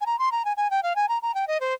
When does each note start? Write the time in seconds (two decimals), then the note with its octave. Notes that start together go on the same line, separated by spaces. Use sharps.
0.01 G#5
0.06 A#5
0.19 C6
0.32 A#5
0.45 G#5
0.57 G#5
0.70 G5
0.83 F5
0.96 G#5
1.09 A#5
1.22 A#5
1.34 G5
1.48 D#5
1.60 C5